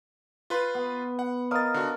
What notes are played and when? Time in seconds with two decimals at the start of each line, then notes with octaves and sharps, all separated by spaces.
0.50 F4 B4 C6
0.75 B3
1.19 F#5
1.51 A#4 D#5 F5 D#6 A6
1.74 D3 F#4